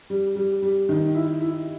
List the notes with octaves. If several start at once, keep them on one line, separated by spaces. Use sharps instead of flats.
G3
G3
G3
D#3
E4
E4